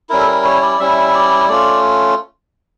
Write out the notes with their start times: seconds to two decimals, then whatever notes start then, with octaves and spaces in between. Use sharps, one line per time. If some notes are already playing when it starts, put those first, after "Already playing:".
0.09 G3 C#4 E4 A#4
0.19 A4
0.27 A#4
0.44 C#5
0.62 D5
0.79 G3 C#4 E4 E5
1.14 D5
1.49 A3 C#4 F4 D5